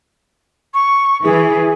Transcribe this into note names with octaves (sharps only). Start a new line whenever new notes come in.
C#6
E3 G#4